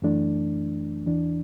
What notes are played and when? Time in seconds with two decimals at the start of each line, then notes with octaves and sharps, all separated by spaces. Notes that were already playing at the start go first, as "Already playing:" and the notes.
0.02 F#2 E3 A3 D4
1.07 E2 E3 D4